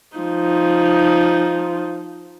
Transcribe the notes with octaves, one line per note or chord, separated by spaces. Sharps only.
F3 D#4